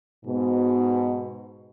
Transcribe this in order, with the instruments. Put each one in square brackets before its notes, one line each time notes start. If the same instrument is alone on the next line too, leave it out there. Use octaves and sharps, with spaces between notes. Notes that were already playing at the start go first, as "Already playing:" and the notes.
[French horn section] G#2 B2